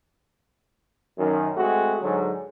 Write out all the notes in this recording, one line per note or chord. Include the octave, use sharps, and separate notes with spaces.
F#2 D#3
G#3 A3 C4 F#4
G#2 D3 F#3